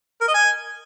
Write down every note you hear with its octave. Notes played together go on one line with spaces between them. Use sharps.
A#4
D#5
G#5